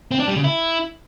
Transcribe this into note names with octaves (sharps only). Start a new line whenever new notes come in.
C4
D4
G3
C#3
E4